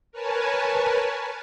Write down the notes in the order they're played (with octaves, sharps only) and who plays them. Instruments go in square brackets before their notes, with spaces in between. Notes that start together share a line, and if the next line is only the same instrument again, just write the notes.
[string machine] A#4 B4 C#5 G#5 A5